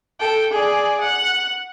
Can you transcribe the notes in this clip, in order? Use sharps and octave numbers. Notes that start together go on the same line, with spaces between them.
A4 G5
G#4 D5
F#5